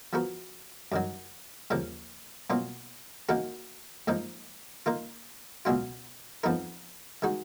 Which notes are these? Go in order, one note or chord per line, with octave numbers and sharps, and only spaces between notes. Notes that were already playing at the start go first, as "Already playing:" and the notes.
F3 B3 F#4 A#4
F#2 D#3 F#3
D#2 C#3 F3 A#3
B2 F#3 A#3 C#4 F4
D#3 A#3 C#4 F#4 A#4
G#2 F3 A#3 D#4
D#3 A#3 F4 A#4
C#2 B2 F#3 C#4 F4
F2 F3 B3 D#4 A#4
D#3 G#3 D#4 F#4